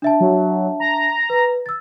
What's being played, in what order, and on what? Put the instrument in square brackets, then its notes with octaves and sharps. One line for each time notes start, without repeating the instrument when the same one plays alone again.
[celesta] D4 E5 A5
[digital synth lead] F#3
A#5
[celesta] B4
E6 A6